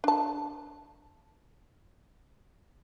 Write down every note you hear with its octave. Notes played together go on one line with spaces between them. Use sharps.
D4 A5